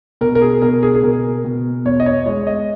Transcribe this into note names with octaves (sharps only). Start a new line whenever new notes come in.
B2 A#4
A#4
G#4
B2 A#4
G#4
G#4
B2 A#4
B2
E2 C#5
D#5
C#5
G#3 C#5
D#5